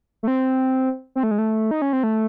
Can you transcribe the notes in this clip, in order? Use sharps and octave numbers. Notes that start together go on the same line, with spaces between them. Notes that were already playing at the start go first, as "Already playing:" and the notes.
A3
C4
C4
A3
G#3
A3
D#4
C#4
C4
A3